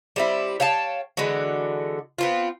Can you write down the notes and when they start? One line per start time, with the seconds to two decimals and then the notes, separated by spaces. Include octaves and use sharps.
0.16 G3 C4 E4
0.60 C#5 F5 G5 A5
1.17 D3 E3 G#3 F#4
2.18 B3 C4 F4